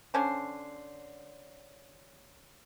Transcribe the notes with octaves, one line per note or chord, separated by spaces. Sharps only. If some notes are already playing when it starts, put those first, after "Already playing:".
D3 C#4 C5